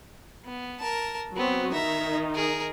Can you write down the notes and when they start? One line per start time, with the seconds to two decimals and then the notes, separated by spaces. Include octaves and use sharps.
0.44 B3
0.80 A#4 A5
1.36 F#3 B3 C4 F#4
1.72 D#3 D#4 E5 A#5
2.34 G#4 A#4